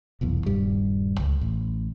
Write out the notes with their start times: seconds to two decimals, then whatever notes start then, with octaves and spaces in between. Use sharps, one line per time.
0.21 F1 B1 E2
0.46 D#1 G2 G3
1.20 C#2
1.41 A1